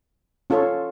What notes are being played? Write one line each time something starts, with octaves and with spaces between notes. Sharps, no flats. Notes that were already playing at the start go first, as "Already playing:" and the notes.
C#4 F4 A4 C#5